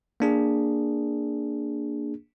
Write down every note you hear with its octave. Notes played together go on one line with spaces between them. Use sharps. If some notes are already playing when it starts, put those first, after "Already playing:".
A#3 D4 G#4